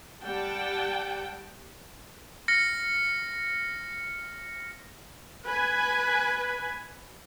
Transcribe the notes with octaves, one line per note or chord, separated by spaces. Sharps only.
G3 F#5 G5 A5
F6 A#6 C#7
B4 G#5